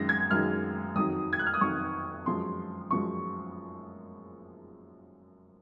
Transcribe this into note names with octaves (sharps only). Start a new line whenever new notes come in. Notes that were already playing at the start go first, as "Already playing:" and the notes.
Already playing: F#2 D#3 G#3 A#6
G#6
F#2 D#3 G#3 F6
F2 D#3 F#3 D#6
G#6
F#6
F6
D#6
F2 D#3 F#3 C#6
F#2 F3 G#3 C6
F#2 F3 G#3 C#6